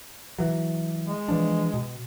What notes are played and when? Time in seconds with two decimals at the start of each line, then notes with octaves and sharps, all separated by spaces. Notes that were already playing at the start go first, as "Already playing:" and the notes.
0.39 E3 F#3
1.07 G#3
1.28 E3 F3 D4
1.74 B2